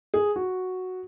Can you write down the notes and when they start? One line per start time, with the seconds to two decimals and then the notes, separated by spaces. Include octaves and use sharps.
0.14 G#4
0.36 F#4